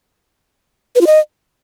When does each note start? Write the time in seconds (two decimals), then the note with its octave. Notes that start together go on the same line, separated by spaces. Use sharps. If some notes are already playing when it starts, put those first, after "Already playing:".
0.95 B4
1.01 F4
1.07 D#5